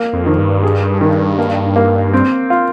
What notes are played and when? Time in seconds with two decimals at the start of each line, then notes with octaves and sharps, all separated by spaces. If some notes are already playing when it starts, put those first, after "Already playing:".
Already playing: A#3
0.13 F2
0.26 D#3
0.39 G2
0.63 G#4
1.01 D#3
1.38 A#3
1.76 A#3
2.13 C4
2.50 F4